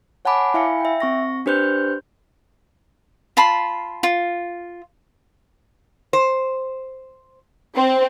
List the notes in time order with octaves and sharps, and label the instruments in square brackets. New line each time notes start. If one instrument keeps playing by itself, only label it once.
[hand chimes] C#5 F#5 G#5 A5 B5 D6
E4 E5 F5 G#5 B5 C#7
E5 G5
C4 C#6 A#6
D4 G4 B4 C5 F#6 G6
[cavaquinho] F4 A5 B5 C6
F4
[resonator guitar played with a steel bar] C5
[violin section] C4